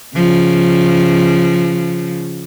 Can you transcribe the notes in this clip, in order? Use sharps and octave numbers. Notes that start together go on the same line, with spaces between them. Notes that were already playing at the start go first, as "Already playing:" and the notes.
C#3 F3